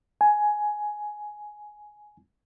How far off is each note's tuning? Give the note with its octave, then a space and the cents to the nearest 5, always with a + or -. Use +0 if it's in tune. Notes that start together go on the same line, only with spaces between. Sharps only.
G#5 +10